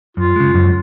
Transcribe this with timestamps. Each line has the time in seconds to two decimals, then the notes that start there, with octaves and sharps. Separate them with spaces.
0.17 F#2 F4
0.36 C#3 G#3
0.54 F#2